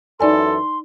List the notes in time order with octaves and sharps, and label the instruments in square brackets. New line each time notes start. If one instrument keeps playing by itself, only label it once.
[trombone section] F#2 E3 A4 [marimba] D#4 D5 G#5 [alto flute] C6